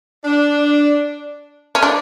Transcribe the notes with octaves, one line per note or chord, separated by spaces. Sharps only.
D4
C#4
D4